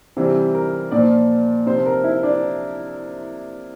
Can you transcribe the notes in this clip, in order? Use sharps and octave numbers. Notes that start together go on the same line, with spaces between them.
C3 E3 G3 C4
A#4
A#2 F3 D5
C3 F3 C5
A#4
E4
D4